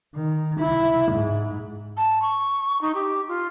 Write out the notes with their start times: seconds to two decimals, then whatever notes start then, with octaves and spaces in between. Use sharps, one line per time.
0.15 D#3
0.60 E4
1.11 G#2
1.97 A5
2.22 C#6
2.81 D#4
2.95 G4
3.28 F4